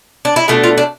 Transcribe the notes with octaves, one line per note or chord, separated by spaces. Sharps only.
D4
E4
B2 A3 D4 F4
F4
D4